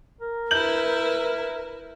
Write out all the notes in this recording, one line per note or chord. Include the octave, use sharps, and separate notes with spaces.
A#4
E4 B4 G6 F#7